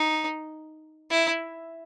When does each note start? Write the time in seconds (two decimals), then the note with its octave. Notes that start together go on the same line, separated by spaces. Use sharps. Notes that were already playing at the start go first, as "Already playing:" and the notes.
Already playing: D#4
1.10 E4